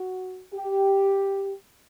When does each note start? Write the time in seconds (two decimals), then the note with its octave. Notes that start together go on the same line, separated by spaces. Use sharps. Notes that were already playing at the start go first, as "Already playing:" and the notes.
Already playing: F#4
0.54 G4